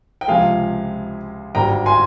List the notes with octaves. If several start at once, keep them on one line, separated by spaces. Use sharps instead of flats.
G5
C#2 C3 F3 G#3 F5 G#5
G#1 G2 G3 G5 A#5
G#5 C6